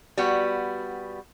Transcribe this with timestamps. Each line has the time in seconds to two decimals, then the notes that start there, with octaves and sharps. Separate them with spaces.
0.18 G3 B3 F#4